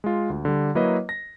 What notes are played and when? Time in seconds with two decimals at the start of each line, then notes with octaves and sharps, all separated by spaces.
0.04 G#3 F4
0.30 D2
0.45 D3 G3
0.75 F#3 A#3 E4 B4 C#5 D#5
1.09 A#6